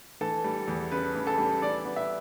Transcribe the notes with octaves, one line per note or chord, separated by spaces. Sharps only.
E3 A4
G3
E2
C#3 B4
E3
A4
G3
E3 D5
B3
E5